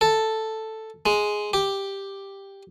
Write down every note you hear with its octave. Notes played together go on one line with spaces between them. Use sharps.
A4
G#3
G4